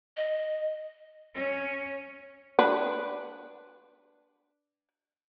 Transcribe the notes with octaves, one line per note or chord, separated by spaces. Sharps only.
D#5
C#4
D4 B4